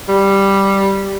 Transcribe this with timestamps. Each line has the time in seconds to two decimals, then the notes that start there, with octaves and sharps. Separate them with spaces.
0.09 G3